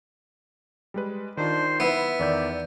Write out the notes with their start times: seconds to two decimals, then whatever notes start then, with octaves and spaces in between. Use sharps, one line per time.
0.94 G3 G#3 B4
1.37 D#3 D4 D#4 F4 C5
1.80 B3 E4 E5
2.19 E2 D#3 D5 G6